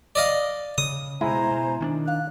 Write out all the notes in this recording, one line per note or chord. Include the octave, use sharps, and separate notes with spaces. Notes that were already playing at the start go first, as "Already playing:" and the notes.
D5 D#5 F5
C#3 D#6
B2 G#3 E4 C5 G#5 A#5
B2
D#3 C#4 D4
F5 F#6